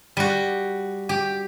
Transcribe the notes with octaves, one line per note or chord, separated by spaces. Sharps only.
G3 F#4
G4